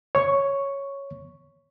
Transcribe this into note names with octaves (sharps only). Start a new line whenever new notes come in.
C#5 C#6